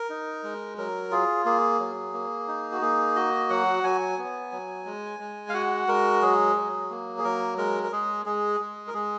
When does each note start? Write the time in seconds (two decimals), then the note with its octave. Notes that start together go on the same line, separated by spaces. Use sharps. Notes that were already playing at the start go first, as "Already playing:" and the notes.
Already playing: A#4
0.10 D#4
0.44 G#3
0.78 F#3 A#4
1.11 F4 G#4
1.45 A#3 G#4
1.80 F#3
2.14 A#3
2.48 D#4
2.72 F#4
2.82 A#3 G#4
3.16 F#4 D#5
3.50 F#3 F#5
3.84 F#3 G#5
4.18 B3
4.52 F#3
4.86 G#3
5.20 G#3
5.49 F5
5.54 F#4 F#5
5.88 G#3 A#4
6.22 F#3 G#4
6.56 F#3
6.90 A#3
7.18 G#4
7.24 F#3 A#4
7.58 G#3 A#4
7.83 A#4
7.92 G#3 G#4
8.26 G#3 G#4
8.60 G#3
8.87 A#4
8.94 G#3 G#4